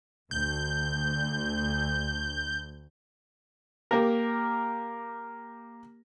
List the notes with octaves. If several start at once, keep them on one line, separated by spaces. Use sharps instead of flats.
D2 G6
A#3 G4 A#4